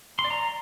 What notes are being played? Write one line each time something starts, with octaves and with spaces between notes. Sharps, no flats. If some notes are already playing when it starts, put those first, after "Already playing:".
C6
D5
A#5